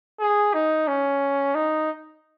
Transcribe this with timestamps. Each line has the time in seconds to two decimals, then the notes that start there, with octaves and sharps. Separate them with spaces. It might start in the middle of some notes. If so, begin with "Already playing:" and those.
0.20 G#4
0.53 D#4
0.87 C#4
1.55 D#4